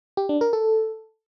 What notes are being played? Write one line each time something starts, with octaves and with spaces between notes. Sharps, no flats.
G4
D4
A#4
A4